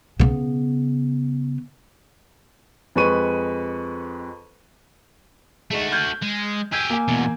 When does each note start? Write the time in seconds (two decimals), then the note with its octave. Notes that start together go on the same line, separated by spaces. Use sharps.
0.20 C#3 B3
2.95 F2 G#3 B4 C#6 D#7
5.71 G#3 A3 D#4 F#4
5.92 F6 G6 G#6
6.22 G#3
6.72 G4 G#4 E6 G6 G#6
6.90 A#3 G#5
7.08 E2 B2